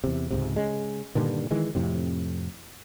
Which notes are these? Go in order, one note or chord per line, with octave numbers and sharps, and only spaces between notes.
E2 C3
C#2 G#2 C3
C#3 G#3
G2 A#2 D3 D#3
D#3 E3 G#3
F2 A2 C3